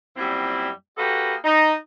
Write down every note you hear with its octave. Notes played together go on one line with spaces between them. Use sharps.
F#2 A#2 G3 C4 E4
A#3 F#4 G4 A4 B4 D#5
D#4